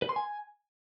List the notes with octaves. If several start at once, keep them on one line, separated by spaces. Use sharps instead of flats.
B4
C6
G#5